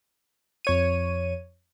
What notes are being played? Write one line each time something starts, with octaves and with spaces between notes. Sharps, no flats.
F2 C#5 D#7